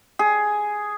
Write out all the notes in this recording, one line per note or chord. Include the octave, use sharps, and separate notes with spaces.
G#4